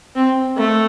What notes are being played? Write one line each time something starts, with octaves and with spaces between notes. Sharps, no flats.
C4
A3